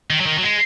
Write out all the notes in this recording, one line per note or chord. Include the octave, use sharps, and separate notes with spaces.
D#3
F#3
D#3
F#3
G#3